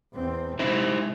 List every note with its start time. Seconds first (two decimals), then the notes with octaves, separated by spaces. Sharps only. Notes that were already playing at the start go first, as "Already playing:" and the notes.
0.13 E2 C4
0.59 C3 G#3 D#4 E4 C5